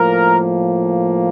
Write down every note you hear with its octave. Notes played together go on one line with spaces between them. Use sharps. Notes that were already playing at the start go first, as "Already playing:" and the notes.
Already playing: A2 F3 A#3 A#4